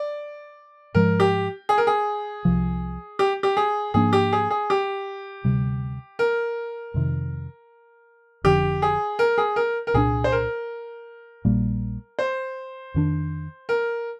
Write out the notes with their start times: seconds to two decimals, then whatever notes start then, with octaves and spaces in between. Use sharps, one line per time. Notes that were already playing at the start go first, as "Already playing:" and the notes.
Already playing: D5
0.95 G#2 F3 G#3 A#4
1.20 G4
1.69 G#4
1.78 A#4
1.87 G#4
2.45 C2 C3 F3
3.19 G4
3.43 G4
3.57 G#4
3.94 G#2 F3 A#3 D4 G#4
4.13 G4
4.33 G#4
4.50 G#4
4.70 G4
5.44 D2 C3 G3
6.19 A#4
6.94 F2 C3 D#3
8.44 F1 F2 D3 G4
8.82 G#4
9.19 A#4
9.38 G#4
9.56 A#4
9.87 A#4
9.94 C2 A#2 G#3 D4 G#4
10.24 C5
10.32 A#4
11.45 A#1 A#2 G3 A#3
12.19 C5
12.94 F2 D#3 A#3 D4
13.69 A#4